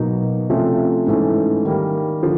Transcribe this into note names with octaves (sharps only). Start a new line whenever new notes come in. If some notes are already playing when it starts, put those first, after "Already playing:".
Already playing: B2 F#3 A#3 D#4
C3 F3 A3 C#4 F4
G#2 E3 A3 C#4
D#3 G3 A#3
D3 F3